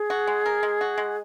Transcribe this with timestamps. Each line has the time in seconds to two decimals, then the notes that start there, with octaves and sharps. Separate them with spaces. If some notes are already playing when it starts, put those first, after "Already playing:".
Already playing: G#4
0.10 F#4
0.27 G#3
0.46 A#4
0.63 G#3
0.81 F#4
0.98 G#3